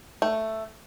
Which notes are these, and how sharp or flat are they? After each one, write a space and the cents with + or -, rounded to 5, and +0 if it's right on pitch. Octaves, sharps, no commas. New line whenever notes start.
A3 +5